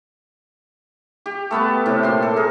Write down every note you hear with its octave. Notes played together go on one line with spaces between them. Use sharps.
G4
A3 B3 B4 A5
A2 C3 G4
A#2 C6
A4
G#4 A#4